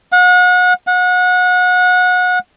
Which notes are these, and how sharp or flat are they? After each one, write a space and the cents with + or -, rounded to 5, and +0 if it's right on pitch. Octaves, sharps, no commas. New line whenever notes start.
F#5 -35
F#5 -30